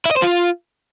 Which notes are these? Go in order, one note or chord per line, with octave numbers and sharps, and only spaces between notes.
E4
D#5
C5
F4